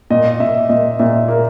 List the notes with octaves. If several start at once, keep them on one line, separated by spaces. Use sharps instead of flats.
A#2 D#5
A#2 E5
A#2 D#5
A#2 E5
A#3